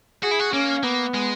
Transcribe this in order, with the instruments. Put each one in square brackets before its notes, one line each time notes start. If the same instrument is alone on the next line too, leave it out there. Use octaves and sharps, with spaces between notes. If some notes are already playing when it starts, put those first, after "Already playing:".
[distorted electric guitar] F#4 [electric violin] G#4
[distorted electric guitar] E4
F#4
[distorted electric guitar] A#3 [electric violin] C#4
[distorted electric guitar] A#3 [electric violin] B3
[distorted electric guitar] G#3